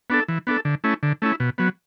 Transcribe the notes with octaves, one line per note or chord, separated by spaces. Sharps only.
B3 D4 A4
E3
B3 D4 A4
D3
A3 C#4 E4
D3
A3 C#4 E4
B2
F#3 B3